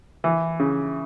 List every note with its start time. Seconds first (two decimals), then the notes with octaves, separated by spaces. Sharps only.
0.24 E3
0.60 C#3